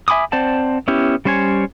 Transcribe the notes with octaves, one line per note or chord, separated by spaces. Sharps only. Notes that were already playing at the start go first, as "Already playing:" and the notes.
E5 G#5 B5 D6 D#6
C4 C5 D5 F#5 A5
B3 C#4 E4 G4
G3 C#4 C5 C#5 G#5